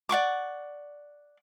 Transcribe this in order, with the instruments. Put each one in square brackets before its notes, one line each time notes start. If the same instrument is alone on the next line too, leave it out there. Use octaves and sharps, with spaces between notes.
[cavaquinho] D5 F#5 C#6 D6